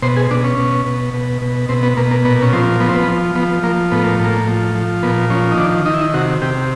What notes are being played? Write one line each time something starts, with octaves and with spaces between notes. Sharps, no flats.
B2 C5
G#4
B2 D4
C#4
B2
B2
B2
B2
B2 C4
B3
B2 A#3
A#3
A#2 B3
C#4
F3 C4
F3 B3
C4
B3
F3
F3 B3
F3 A#3
A2 B3
A#3
A2 A#3
F3
F3
A#2 B3
F3 C#4
D#4
D#3 D4
D#3 D#4
E4
D#4
C3 F#4
C3 G4